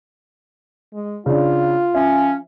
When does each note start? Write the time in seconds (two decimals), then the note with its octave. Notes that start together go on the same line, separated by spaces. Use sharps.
0.94 G#3
1.26 C#3 D4 F4
1.94 F3 C#4 E5